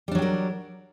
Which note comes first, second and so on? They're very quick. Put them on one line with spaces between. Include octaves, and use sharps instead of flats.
G3 D4 F#3 G4 A#4